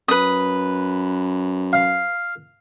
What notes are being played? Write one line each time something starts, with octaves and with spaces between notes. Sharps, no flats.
F#2 B4 D#6
F5